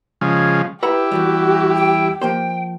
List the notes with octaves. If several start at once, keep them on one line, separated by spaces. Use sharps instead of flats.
C#3 F3 G#3
E4 G4 B4 F#5 A#5
E2 E3 G3 F#4
G5
F3 A#3 C5 G5